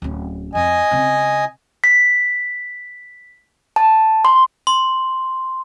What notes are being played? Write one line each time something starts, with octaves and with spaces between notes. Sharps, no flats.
D1 C#4
F2 D#5 G#5
C#3 C4
B6
A5
C6
C6